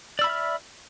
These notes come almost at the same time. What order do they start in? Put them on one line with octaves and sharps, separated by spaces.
D5 E6 B5 E5 F6